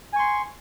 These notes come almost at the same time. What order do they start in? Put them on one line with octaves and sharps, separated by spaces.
G#5 C#6 C6